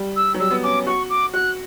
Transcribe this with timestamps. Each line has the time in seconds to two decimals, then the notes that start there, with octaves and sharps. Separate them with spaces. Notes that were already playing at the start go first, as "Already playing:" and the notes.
Already playing: G3
0.16 E6
0.35 F#3
0.40 G3 E6
0.51 B3
0.63 C#4 D6
0.87 F#4 C#6
1.10 D6
1.34 F#4 F#6